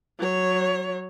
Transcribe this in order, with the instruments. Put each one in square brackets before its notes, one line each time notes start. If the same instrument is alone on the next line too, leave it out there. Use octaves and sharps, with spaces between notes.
[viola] F#3 C#5